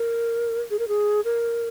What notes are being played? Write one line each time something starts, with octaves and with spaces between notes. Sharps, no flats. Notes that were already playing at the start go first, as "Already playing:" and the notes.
Already playing: A#4
G#4
A#4
G#4
A#4